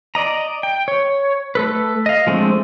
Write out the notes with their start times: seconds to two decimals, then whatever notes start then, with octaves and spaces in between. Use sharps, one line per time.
0.15 D5 D#5 A#5
0.63 G5
0.88 C#5
1.55 A3 A4 B4
2.06 D#5 F5
2.27 F3 G#3 A3 C4 D4